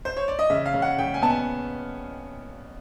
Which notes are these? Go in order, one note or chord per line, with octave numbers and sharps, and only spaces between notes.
C5
C#5
D5
D#5
C#3 E5
F5
C#3
F#5
C#3 G5
G#5
B3 A5
G#5